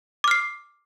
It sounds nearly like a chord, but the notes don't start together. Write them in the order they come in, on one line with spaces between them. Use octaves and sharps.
D6 F6 C7